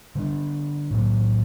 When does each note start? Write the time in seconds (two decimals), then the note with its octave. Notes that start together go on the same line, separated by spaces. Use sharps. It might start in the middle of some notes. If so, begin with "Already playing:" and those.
0.15 D3 G3 D4
0.91 A2 F#3 A#3